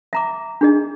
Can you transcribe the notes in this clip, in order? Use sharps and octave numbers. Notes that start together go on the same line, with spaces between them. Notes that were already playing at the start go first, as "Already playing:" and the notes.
E5 A#5 D6
D4 G#4 D#5